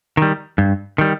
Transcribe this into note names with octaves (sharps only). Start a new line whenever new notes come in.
D#3 G3
G2
D#3 G3